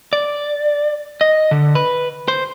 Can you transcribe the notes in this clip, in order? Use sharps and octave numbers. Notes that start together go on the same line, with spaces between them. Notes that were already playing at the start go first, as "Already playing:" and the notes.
D5
D#5
D3
B4
C5